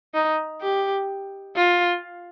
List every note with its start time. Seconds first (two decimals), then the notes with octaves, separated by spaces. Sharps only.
0.14 D#4
0.62 G4
1.56 F4